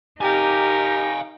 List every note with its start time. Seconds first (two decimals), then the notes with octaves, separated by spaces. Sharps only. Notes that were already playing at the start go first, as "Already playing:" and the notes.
0.21 D#4 G4 A#4 F5 G#5